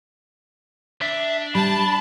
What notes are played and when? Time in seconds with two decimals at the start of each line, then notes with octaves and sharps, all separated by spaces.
1.02 D4 E5
1.55 G3 A5 B5